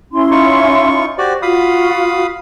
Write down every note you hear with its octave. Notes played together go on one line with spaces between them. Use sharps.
C#4 E4 C6
D#4 F4 C#6
F#4 G4 C5 D5
F4 F#4 F5 B5 D#6